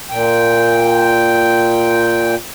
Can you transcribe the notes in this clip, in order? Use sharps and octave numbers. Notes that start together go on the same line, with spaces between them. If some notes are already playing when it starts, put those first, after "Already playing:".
A#2 G5